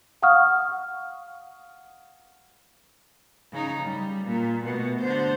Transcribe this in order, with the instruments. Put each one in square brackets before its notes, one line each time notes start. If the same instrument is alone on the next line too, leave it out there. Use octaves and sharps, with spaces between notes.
[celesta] F5 F#5 C#6 D#6 F6
[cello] C#3 D#4
G3
A#2
B2 A3
D3 C5